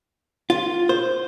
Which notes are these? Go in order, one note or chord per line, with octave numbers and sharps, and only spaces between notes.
F4
C5